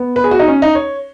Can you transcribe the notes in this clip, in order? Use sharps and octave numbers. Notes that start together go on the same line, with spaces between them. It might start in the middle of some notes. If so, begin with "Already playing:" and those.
Already playing: B3
B4
G#4
F#4
D#4
C#4
D#4
C#5